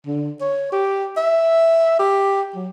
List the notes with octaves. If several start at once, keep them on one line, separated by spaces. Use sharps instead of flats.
D3
C#5
G4
E5
G4
F#3